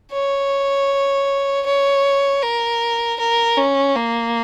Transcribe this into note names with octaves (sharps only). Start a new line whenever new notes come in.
C#5
C#5
A#4
A#4
C#4
A#3